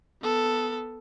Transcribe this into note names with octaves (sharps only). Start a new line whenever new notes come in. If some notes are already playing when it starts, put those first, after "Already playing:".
B3 A4